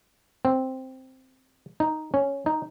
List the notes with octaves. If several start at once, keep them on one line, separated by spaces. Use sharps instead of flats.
C4
D#4
C#4
D#4